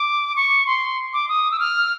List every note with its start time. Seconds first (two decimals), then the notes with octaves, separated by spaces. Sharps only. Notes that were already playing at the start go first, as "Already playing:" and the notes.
Already playing: D6
0.36 C#6
0.67 C6
1.13 D6
1.29 D#6
1.51 E6
1.60 F6